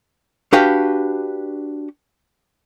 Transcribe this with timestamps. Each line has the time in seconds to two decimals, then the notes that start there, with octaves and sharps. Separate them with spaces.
0.53 D4 F#4 G4 B4 F5